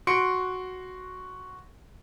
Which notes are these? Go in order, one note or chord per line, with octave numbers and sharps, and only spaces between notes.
F#4 C6 C#7 D7